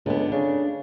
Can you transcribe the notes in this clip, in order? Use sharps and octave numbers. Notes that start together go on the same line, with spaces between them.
C#2 D3 B3
C#3 D4